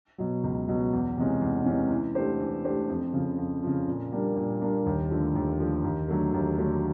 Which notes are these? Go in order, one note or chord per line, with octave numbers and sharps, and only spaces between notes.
B2 F#3
C#2
B2 F#3
E2
C3 E3 G#3 C#4
E2
C3 E3 G#3 C#4
E3
A3 D4 G4 C5
E3
A3 D4 G4 C5
F2
C#3 F3
F2
C#3 F3
A#2
G3 A#3 D4
A#2
G3 A#3 D4
D#2
D3 F3 A3
D#2
D3 F3 A3
D#2
D3 F#3 A3
D#2
D3 F#3 A3